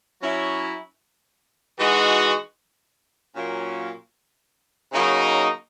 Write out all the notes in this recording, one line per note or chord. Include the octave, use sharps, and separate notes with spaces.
F#3 C#4 E4
E3 G#3 D#4 F#4
A#2 F#3 A#3 C#4
C#3 F#3 A#3 D#4